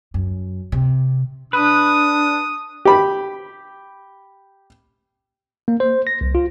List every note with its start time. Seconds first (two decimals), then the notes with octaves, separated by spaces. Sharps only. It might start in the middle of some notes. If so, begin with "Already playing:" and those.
0.14 F#2
0.72 C3
1.53 D4 B4 D#6
2.85 G4 B5
5.68 A#3
5.80 C5
6.07 A#6
6.21 C2
6.35 F4